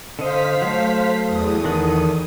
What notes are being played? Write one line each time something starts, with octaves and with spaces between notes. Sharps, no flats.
D3 C5 D#5 F5 B6
F#3 A3
E2 D#6
D#3 A4 F#5